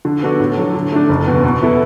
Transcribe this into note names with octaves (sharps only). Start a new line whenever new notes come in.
D3
B3 D4 F#4 A4
A2
F#3 D4 A4
D3
A3 D4
F#1
E2 B2
B2
B3 E4 A4